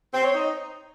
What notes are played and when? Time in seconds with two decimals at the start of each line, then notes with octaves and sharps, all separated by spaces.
0.14 C4
0.24 C#5
0.34 D#4